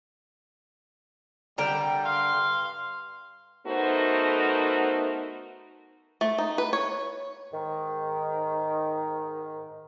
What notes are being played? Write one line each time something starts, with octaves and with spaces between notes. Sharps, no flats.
D3 G3 A#4 G5
G2 F5 C6
A3 B3 D#4 F#4 A#4 C5
A3
D#4
B4
C#5
G#2 D#3